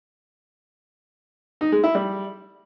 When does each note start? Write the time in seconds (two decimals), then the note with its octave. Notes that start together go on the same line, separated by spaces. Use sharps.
1.61 D#4
1.72 G#3
1.83 E4
1.95 G3